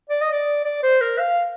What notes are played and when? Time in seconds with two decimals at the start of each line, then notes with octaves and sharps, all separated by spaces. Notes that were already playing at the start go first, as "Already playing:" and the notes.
0.10 D5
0.22 D#5
0.32 D5
0.65 D5
0.83 C5
1.01 A#4
1.19 F5